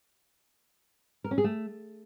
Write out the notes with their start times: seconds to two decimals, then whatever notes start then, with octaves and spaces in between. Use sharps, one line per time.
1.24 A#4
1.31 C#4
1.38 G#4
1.44 A3